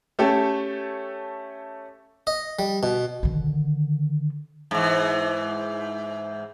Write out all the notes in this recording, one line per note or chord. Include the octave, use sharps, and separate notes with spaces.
A3 C#4 G4 A4
D#5
G3
B2
D3 D#3
G#2 E3